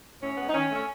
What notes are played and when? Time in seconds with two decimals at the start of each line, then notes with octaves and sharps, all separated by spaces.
0.21 A2 C#4
0.37 G#3 B3
0.48 D#4
0.54 D#3 C#4
0.71 A3 C#4